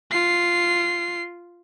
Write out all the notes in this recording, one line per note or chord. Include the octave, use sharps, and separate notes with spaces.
F4 C7